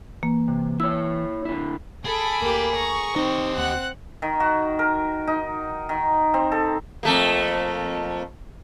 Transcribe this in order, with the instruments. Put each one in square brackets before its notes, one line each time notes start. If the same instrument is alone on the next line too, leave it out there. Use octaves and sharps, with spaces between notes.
[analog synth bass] E3 [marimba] A#3
[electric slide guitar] C3
[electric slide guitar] E4 C#5 [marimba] E6
[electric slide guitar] D3 E4
[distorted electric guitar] G#4 [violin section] A4 B5 D7
[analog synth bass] D2 [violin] A#3 G4
[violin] A#5 [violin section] C#6
[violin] C4 [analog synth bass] D#4 [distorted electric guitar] G4 D#5
[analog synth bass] D#2 [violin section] F#5 F#6
[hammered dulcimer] D#3
F#4
A#4
D#4
D#3
C4
A4
[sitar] F2 A3 A#3